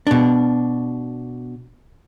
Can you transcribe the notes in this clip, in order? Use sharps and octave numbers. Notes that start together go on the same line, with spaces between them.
B2 D4